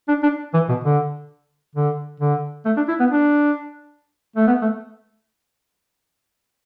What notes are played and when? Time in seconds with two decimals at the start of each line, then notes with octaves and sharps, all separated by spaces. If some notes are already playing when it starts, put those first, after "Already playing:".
0.08 D4
0.23 D4
0.54 E3
0.69 B2
0.84 D3
1.75 D3
2.21 D3
2.66 A3
2.77 D4
2.88 E4
3.00 B3
3.11 D4
4.36 A3
4.47 B3
4.62 A3